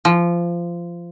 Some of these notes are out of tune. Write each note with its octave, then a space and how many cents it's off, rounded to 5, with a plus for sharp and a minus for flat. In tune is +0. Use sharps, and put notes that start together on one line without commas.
F3 -20